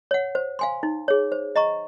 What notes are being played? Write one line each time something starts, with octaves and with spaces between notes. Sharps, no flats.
C#5 F#5
C5
F5 G#5 C6
D#4
G#4 C#5
C5
D#5 A#5 C#6